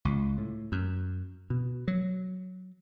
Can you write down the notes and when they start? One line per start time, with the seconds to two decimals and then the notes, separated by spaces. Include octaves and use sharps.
0.05 C#2
0.38 A2
0.72 F#2
1.50 B2
1.88 F#3